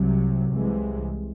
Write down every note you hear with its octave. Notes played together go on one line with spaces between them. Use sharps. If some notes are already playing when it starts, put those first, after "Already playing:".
Already playing: C2 C3 F#3
C2 C3 E3 G#3